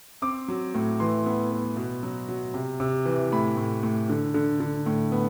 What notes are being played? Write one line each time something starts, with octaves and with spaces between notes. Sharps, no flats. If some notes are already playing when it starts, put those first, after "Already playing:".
C4 D6
F#3
A2
E3 C6
B3
B3
B2
F#3
F#3
C3
C3
E3
A2 B5
A2
A2
D3
D3
D3
A2
B3